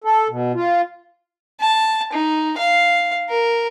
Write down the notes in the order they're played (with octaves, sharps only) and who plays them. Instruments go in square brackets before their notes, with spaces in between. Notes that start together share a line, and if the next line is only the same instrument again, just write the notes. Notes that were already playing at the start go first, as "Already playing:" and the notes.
[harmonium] A4
B2
F4
[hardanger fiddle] A5
D#4
F5
A#4